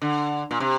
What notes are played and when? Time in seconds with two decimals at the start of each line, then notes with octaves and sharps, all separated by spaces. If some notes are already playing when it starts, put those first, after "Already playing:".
0.02 D3
0.51 A#2
0.60 C3